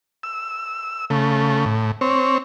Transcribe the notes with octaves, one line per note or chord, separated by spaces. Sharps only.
E6
C#3 A3
A2
C4 C#5